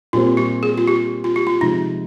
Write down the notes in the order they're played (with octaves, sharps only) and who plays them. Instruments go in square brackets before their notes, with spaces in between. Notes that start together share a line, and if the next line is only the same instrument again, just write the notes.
[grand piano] A#2 G3 C4 [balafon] F4
[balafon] G4
G#4
F4
G4
F4
G4
F4
[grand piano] C3 F3 G#3 [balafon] D#4